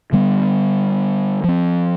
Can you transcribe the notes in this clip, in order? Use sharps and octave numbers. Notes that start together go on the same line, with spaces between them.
D3 G3 B3
F3 C4